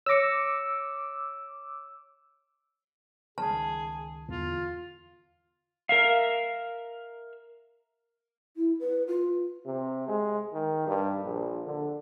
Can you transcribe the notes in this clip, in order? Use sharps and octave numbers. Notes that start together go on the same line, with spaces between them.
C#5 D6 E6 A#6 C#7
C#2 D#3 G#4 A5
E2 D3 F4
A#4 E5 F5
E4
B4
F4
C3
G#3
D#3
G2
A#1
D3